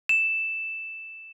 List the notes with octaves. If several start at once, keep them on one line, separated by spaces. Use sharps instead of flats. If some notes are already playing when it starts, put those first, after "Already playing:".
E7